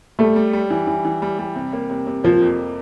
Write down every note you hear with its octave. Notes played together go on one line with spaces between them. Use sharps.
G3 A3
G3
G3
E3
E3
E3
G3
G3
C3
A#3
C3
C3
F3 A#3
F2